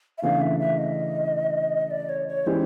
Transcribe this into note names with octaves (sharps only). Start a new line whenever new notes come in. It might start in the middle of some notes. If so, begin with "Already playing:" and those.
E5
C#3 E3 A3 D4 F5
E5
E5
D#5
D5
C#5
C#5
E3 G#3 C#4 E4 G4 C5